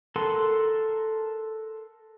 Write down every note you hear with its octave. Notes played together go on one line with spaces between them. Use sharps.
A4 A#4 F#5 C6